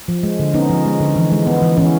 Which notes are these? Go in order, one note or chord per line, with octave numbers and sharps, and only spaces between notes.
F3
G#3
D3
B3 C#4 D#4
F3
G#3
D3
E3
G#3
B3
E3
E3 B3 C#4